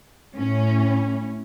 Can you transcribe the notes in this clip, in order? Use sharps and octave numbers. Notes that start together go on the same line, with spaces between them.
A2 C#4